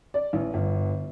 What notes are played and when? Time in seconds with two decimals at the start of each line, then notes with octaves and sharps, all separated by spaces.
0.14 D5
0.33 A1
0.54 G1